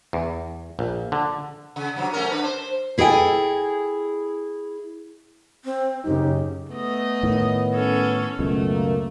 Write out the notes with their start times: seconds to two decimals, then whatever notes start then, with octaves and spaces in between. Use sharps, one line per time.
0.13 E2
0.79 A#1
1.12 D3
1.76 C#3
1.96 G2 C3 F#3
2.13 A3 C#4 A#4
2.31 D4 B4
2.44 C5
2.98 E4 G#4 A4 D#5 G5 G#5
5.65 C4
6.05 F#2 C#3 D#4 G4
6.71 A3 B3 D#5
7.23 A2 D#3
7.74 C#4 A4
8.39 C#2 F#2 B2 A3
8.71 A#3